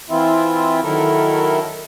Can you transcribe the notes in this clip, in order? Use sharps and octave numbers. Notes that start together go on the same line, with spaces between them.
E3 C4 E4 F4 E5
D#3 F#3 E4 A4 A#4